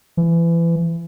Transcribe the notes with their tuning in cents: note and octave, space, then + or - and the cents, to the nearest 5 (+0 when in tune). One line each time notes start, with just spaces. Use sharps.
E3 +30